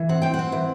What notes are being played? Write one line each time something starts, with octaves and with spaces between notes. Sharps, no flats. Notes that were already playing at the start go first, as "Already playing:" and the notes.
Already playing: E3
C4 F#5
C4 G5
F#5
C4
E3